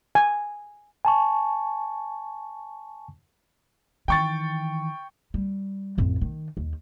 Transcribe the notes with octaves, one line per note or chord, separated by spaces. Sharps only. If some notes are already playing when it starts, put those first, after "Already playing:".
G#5
G#5 A5 C#6
D#3 E3 G5 C#6 A6
G3
A1 F2
D#3
D#2